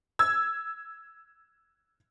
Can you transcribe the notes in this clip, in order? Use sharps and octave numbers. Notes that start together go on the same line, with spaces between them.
E6 G#6